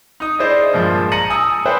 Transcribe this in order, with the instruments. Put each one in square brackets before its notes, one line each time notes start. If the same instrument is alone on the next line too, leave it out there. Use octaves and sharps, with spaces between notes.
[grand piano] D#4 D#6
D4 E4 G#4 C5 D5 D#5
G2 A#2 F3 G#3
A5 A#5 A#6 C#7 D#7 F#7
G#5 D#6 E6
A4 B4 C5 E5 G5